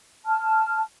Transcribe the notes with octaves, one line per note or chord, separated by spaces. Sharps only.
A5 F6